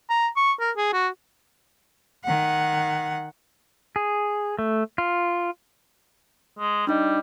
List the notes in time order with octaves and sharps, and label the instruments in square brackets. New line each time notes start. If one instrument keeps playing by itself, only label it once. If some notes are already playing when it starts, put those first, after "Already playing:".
[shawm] A#5
C#6
A#4
G#4
F#4
[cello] D#3 F#5
[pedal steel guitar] G#4
A3
F4
[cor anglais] G#3
[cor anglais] G3 [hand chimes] D4 D#4 D#5